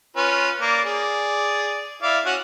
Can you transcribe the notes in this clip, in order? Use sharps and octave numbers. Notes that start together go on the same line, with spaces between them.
C#4 F4 B4
A#3 D5
G#4 D5
E4 D5 F5
C#4 F#4 F#5